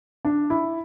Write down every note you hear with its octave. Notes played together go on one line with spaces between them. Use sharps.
D4
E4